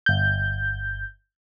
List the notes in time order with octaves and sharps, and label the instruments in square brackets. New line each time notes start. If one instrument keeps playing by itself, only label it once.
[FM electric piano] G1 G6